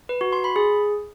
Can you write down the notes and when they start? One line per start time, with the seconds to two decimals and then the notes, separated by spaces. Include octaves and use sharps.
0.09 B4
0.21 F#4
0.33 C6
0.44 B5
0.56 G#4